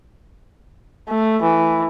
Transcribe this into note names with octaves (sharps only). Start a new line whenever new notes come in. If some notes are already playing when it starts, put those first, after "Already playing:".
A3
E3